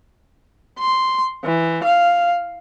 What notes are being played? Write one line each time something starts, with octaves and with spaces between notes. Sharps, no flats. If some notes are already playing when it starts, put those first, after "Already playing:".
C6
E3
F5